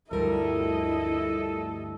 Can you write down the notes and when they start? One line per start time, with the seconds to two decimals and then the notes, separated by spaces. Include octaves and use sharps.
0.11 D2 G2 F3 G3 E4 A4 A#4 D#5